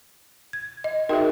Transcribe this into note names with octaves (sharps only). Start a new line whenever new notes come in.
G#6
D#5
D#4 F#4 G#4 A#4 E5 G5